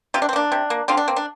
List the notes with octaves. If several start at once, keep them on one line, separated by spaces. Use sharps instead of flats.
C3 F4
D4
C4
A#3 D4
C3
A#3
D3 C4 F4
D4
A#3 C4
D4